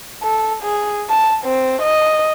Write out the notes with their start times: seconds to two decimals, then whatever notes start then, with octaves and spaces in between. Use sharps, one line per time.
0.23 A4
0.63 G#4
1.10 A5
1.45 C4
1.82 D#5